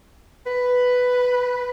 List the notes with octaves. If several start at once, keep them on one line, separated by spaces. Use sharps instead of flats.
B4